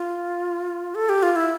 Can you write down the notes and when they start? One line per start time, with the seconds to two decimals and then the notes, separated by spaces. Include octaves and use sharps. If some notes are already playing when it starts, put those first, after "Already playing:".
Already playing: F4
0.95 A4
1.09 G4
1.23 F4
1.36 E4